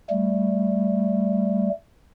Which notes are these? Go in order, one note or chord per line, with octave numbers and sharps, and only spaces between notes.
G3 A3